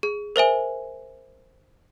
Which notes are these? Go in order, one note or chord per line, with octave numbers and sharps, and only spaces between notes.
G#4
A#4 C5 E5 G#5